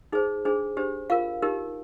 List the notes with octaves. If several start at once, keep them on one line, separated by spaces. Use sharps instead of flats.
D#4 G#4 C5
D4 G#4 C5
D4 G4 C5
F4 A#4 F5
D#4 G4 A#4